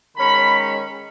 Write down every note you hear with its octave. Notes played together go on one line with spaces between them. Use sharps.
D#3 G#3 C#4 B5